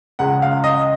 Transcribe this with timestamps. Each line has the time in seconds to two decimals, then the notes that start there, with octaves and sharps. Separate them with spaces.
0.19 C#2 C#3 G#3 F#5
0.42 F5
0.64 D#5